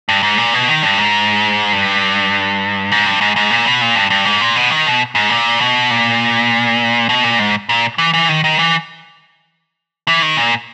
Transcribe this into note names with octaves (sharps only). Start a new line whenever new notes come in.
G2
G#2
A#2
B2
D#3
G2
G#2
G2
G#2
G2
G#2
G#2
A#2
B2
A#2
G2
G2
G#2
A#2
B2
D#3
B2
G#2
A#2
B2
A#2
B2
A#2
G#2
A#2
E3
E3
D#3
D#3
E3
E3
D#3
A#2